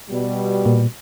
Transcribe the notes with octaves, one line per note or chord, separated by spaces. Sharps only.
B2 G3
A#2